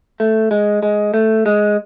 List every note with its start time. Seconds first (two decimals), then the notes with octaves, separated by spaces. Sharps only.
0.20 A3
0.51 G#3
0.83 G#3
1.14 A3
1.46 G#3